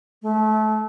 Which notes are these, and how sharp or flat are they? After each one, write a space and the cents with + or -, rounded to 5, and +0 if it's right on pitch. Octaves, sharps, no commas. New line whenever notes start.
A3 -30